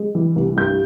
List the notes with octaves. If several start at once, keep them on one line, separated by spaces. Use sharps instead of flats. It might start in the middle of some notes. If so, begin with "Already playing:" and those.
Already playing: G#3
E3
C2
G2 G6